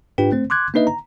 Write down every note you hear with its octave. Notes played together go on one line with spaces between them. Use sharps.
G#2 D4 F4 G4 B4 G5
A3 C4 C5
C6 D6 F#6 G#6
A#3 D4 D#4 B4 D#5 E5
A#5